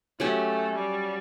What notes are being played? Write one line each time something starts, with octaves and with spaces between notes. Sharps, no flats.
F#3 A3 C#4 G4
G3